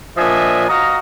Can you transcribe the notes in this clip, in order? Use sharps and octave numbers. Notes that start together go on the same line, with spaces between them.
A#2 F3 D4 D#5 E5 G#5
F#4 D#5 F5 A#5